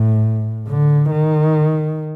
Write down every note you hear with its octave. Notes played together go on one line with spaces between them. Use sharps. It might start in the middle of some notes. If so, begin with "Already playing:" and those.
Already playing: A2
D3
D#3